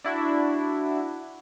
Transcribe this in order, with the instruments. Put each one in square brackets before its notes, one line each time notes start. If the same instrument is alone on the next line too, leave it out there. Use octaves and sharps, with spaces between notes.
[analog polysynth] D4 E4 F#4